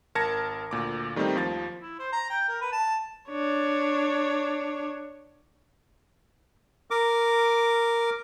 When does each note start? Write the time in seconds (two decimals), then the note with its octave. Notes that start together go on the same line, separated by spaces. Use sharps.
0.15 G#1 A#4 A5 G#6 A#6 C#7
0.71 D2 A#2 D6
1.16 D#3 G3 A3 C4 D#4
1.35 D#2 F3 A6
1.80 E4
1.99 C5
2.13 A#5
2.30 G5
2.49 A#4
2.61 B4
2.72 A5
3.29 D4 C#5
6.91 A#4 D6